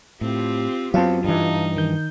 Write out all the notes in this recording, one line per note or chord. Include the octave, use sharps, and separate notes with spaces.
A2 C4 F4 G4
F#2 F#3 B3 C4 F4 F5 A5
G2 E3 D#4
D#3 G6